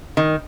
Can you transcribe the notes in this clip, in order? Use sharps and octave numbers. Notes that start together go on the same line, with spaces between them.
D#3